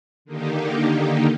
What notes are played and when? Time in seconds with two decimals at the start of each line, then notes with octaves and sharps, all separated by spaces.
0.25 D3 D#3 A#3 D#4 G4